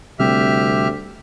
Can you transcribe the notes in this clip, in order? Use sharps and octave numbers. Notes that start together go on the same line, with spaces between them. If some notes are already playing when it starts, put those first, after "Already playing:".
D2 C3 G3 C4 G4 E5 F6